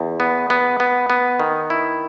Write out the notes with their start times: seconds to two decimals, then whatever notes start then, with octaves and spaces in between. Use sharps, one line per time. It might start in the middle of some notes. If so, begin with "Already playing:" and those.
Already playing: E2
0.20 B3
0.50 B3
0.80 B3
1.10 B3
1.40 D#3
1.70 E4